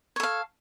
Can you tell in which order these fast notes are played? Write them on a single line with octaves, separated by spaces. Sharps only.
C#5 A4 F5